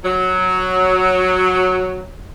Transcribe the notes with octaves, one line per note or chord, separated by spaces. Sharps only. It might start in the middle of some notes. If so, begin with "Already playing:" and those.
F#3